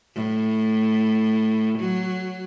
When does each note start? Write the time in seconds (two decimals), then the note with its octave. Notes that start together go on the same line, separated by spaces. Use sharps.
0.15 A2
1.79 F#3